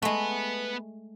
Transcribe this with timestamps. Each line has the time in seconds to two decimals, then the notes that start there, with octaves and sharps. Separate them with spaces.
0.02 G#3 A3 B3 B4